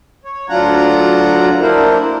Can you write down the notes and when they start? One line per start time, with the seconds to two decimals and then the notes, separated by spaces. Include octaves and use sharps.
0.25 C#5
0.49 D2 F#3 D4 F4 F#5 A#5
1.61 A#3 D4 E4 A#4 C5